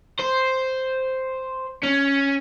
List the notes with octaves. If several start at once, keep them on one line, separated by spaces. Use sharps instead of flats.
C5
C#4